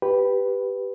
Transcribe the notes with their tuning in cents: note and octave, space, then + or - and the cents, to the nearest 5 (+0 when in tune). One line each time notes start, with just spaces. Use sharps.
G4 +0 B4 +0